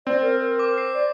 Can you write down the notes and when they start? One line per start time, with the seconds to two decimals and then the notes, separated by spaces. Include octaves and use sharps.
0.07 C4 D5
0.22 A#4
0.40 A#4
0.59 D6
0.78 C7
0.94 D5